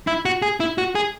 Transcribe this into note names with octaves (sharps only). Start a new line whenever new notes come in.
E4
F#4
G#4
E4
F#4
G#4